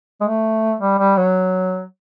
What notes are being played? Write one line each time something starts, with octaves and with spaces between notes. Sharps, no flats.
G#3
A3
G3
G3
F#3